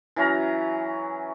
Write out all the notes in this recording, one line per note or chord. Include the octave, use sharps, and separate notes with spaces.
E3 F#3 C#4 A#5